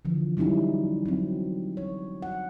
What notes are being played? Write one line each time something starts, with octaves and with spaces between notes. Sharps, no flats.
D3 E3 F3
F#3 G3 C#4 D#4 E4
F#3 C4
C#5
F#5